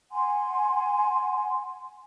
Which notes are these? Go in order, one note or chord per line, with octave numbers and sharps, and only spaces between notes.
F#5 G#5 C6